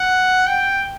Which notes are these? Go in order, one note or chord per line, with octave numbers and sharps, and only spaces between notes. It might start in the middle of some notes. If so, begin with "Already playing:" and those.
Already playing: F#5
G5